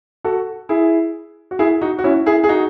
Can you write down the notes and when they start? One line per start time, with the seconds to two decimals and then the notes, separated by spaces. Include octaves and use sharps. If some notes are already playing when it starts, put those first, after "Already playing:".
0.24 F#4 A4
0.69 E4 G#4
1.51 F#4
1.59 E4 G#4
1.81 D#4 F#4
1.99 F#4
2.04 C#4 E4
2.26 E4 G#4
2.44 G#4
2.49 D#4 F#4